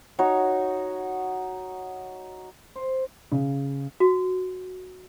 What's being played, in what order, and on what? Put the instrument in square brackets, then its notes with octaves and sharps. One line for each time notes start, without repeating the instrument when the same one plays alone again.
[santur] D#4 F#4 C#5
[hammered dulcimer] C5
[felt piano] C#3
[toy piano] F#4